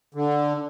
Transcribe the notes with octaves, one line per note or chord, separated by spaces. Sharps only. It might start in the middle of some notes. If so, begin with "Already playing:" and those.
D3